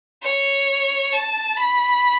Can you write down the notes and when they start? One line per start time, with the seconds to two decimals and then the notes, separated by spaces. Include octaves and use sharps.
0.22 C#5
1.13 A5
1.57 B5